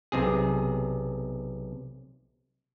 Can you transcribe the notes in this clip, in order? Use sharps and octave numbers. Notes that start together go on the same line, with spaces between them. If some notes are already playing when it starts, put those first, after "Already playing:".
B1 C3 G#4